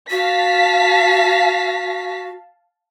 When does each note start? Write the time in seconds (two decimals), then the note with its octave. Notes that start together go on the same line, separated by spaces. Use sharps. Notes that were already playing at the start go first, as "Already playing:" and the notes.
0.11 F#4 F5 A5 B6